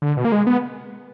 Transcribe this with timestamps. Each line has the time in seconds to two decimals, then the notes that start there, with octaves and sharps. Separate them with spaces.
0.02 D3
0.17 B2
0.25 A#3
0.32 G#3
0.47 B3